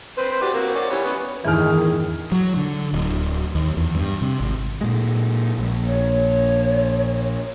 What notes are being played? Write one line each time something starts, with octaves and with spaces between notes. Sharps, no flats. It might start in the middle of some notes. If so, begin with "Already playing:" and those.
C4 B4 C5
F#4 G4 D5
A#3 C4 F#4
C#4 D5
E3 G3 C#5
B3 C#4
G1 E2 A2 D#3 E3 G#4 F6
F#3
D3
D1
D#2
E2
G2
C3
G#1
A#2 G#3
A#1
C#5